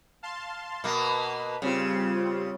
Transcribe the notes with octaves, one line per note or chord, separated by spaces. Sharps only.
F5 A5 C6
B2 A#3 B4
C#3 G3 C4 F4